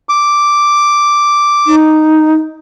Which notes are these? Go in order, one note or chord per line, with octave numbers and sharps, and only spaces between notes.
D6
D#4